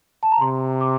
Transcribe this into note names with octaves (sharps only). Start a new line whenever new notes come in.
A5
A#5
C3 C6
D6